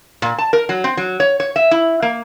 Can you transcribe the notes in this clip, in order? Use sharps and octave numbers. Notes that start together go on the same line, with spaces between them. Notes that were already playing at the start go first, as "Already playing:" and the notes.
A#2
A5
A#4
F#3
C4
F#3
C#5
C#5
E5
E4
A#3